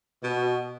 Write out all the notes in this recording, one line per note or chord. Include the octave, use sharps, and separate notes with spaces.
B2